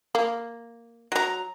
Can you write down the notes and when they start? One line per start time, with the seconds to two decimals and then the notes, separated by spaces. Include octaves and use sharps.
0.15 A#3
1.12 F#3 A#5